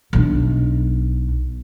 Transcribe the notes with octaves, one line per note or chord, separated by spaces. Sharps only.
B1 D4